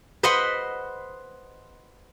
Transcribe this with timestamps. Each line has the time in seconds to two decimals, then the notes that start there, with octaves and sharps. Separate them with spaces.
0.23 B4 C5 D#5 F#5 B5 C6